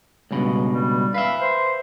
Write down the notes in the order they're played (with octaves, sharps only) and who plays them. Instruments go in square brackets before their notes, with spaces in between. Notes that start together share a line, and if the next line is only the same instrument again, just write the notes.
[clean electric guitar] C#2 G2 B2
[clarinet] G3
[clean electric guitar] B4 E5 [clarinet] F5
[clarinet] C5